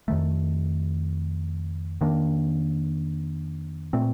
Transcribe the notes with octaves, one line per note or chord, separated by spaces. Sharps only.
F2 D#3 A3
F2 D#3 A#3 D4
A#2 A3 C4